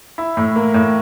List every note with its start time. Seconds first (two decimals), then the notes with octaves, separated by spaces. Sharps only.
0.18 E4
0.37 A2
0.56 A#3
0.74 A2